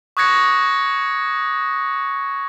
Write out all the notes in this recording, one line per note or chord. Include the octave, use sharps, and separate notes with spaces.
C#6 D#6 F#6 G#6 A#6 C#7